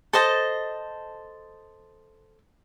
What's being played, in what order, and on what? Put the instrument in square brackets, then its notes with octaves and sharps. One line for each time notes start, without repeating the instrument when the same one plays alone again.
[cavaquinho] A4 C5 D#5 A5